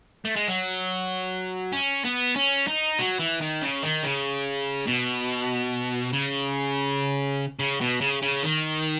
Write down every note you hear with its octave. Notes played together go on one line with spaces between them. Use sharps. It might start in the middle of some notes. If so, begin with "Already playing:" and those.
A3
G#3
F#3
C#4
B3
C#4
D#4
F#3
E3
D#3
C#3
D#3
C#3
B2
C#3
C#3
B2
C#3
C#3
D#3